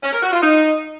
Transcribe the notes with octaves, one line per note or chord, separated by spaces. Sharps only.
C#4
A#4
F#4
F4
D#4